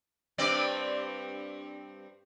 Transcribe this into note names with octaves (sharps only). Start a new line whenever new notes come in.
G2 C4 D5